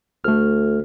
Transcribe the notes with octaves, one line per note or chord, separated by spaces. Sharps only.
D2 A3 F6